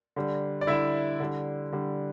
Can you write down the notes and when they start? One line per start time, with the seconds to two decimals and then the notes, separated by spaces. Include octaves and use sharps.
0.16 D3 G3
0.61 D5
0.67 D3 G3 E4 E5
1.20 D3 G3
1.72 D3 G3